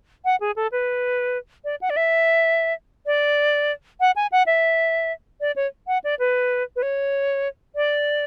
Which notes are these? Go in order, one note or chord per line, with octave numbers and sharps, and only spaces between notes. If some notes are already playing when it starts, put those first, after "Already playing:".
F#5
G#4
A4
B4
D5
F#5
D5
E5
D5
F#5
G#5
F#5
E5
D5
C#5
F#5
D5
B4
B4
C#5
D5